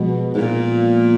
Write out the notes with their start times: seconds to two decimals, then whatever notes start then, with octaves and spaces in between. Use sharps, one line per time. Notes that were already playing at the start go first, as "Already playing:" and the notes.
Already playing: B2 F3 G#3 B3
0.35 G#2
0.39 A#2